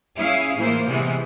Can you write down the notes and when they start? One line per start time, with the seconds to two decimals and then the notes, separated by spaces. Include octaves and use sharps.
0.18 C#4 E4 G#4 E5 F5
0.57 A2 E3 A#3 E4 F4 C5
0.86 C3 E3 G3 G#3 B3